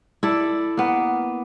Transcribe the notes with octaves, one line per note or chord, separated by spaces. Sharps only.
E4 A4 D5
A#3 B3